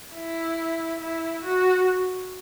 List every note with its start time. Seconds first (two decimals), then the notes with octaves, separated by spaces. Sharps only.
0.14 E4
1.00 E4
1.44 F#4